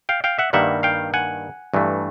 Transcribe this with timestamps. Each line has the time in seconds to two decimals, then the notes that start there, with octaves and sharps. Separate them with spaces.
0.09 F5 G5
0.24 F5 G5
0.39 E5 F#5
0.53 G2 D#3 G3 A#3 E5 F#5
0.83 F5 G5
1.14 F#5 G#5
1.74 G2 E3 A3